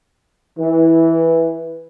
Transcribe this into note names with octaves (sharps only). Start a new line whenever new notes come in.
E3